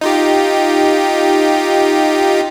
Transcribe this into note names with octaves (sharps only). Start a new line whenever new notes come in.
D#4 F4 G4